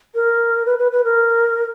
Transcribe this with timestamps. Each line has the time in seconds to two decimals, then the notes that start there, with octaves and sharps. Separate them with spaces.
0.14 A#4
0.65 B4
0.78 B4
0.91 B4
1.04 A#4